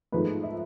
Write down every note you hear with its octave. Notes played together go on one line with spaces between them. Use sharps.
G#2 F3 A3 B4
E5